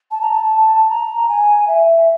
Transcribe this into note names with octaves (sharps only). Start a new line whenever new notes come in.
A5
A#5
A5
A#5
G#5
E5